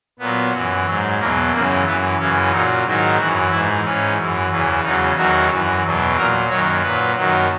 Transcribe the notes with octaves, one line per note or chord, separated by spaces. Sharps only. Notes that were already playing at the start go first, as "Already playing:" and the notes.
A#2 F#3 B3
F#2 E3
G#2 F#3
E2 B2 F#3 A#3
F#2 C#3 E3 A#3
F#2 E3 B3
F#2 C#3 E3 C#4
A#2 F#3 D#4
G#2 D#3 F#3
F#2 E3 F#4
G#2 E3 E4
G#2 E3 C#4
F#2 E3
E2 C#3 E3
E2 C#3 F#3 D#4
E2 D#3 F#3 F#4
F#2 E3
E2 B2 F#3
A#2 F#3 A#4
F#2 D#3 F#3 C#5
A#2 F#3 B4
F#2 D#3 F#3